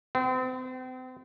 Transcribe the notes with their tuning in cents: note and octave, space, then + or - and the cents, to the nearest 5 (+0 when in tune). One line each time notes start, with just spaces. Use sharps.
C4 -35